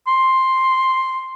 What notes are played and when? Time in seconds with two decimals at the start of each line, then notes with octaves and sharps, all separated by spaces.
0.07 C6